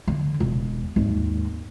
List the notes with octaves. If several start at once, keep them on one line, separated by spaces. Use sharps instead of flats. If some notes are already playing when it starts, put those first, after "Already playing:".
D3
E1
G#1 D#2